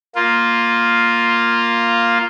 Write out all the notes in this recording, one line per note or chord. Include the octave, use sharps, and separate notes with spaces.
A#3 F4